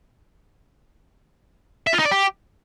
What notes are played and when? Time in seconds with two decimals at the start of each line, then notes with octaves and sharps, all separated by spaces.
1.87 E5
1.93 F4
1.99 D#4
2.05 D5
2.11 G4